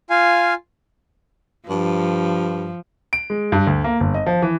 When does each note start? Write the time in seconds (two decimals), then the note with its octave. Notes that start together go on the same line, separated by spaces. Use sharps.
0.10 F4 F5 G#5
1.69 G2 F3
3.13 D7
3.30 G#3
3.52 G2
3.67 D2
3.84 A#3
4.00 G1
4.14 D#5
4.26 F3
4.42 E3